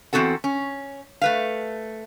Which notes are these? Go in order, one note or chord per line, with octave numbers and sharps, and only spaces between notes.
E2 G3 C4 F#4 A4 F#5
C#4
A3 B4 F5